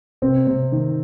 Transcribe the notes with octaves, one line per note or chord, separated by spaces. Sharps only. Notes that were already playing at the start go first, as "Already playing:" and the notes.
C3 C4
C3
D#3